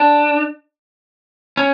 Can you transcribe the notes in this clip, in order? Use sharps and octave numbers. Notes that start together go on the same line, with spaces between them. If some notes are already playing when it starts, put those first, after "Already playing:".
Already playing: D4
C#4